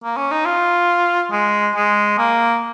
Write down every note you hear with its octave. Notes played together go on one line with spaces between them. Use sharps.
A#3
C#4
D#4
F4
G#3
G#3
A#3